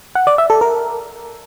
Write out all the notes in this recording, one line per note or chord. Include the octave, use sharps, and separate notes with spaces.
F#5
D5
E5
A4
A#4